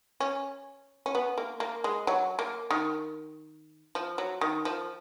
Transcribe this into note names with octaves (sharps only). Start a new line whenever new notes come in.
C#4
C#4
B3
A#3
A#3
G#3
F#3
A#3
D#3
F3
F#3
D#3
F3